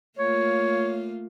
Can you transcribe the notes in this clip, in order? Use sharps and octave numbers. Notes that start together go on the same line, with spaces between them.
A3 A#3 F4 C#5